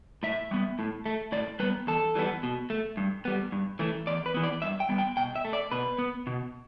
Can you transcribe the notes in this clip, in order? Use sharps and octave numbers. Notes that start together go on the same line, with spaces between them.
A2 E5
G3 B3
A2
A3
A2 D5
G3 B3 B4
E2 A4
E3 G3 B3
B2
A3
G2
G3 B3
G2
E3 A3
E2 D5
B4
E3 B3
D5
G2 E5
G5
G3 B3
G5
B2 G5
E5
A3
D5
B2 B4
B3
B2